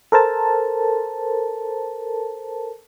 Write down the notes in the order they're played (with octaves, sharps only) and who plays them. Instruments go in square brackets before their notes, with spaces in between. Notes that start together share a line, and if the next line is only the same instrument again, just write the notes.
[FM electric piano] A4 A#4 C5 A5